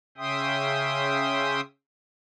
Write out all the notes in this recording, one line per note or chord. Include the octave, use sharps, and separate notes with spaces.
C#3 C#4 E5 G5 C6 D#6